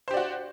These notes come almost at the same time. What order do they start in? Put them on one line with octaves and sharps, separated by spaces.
C5 G4 D5 F#4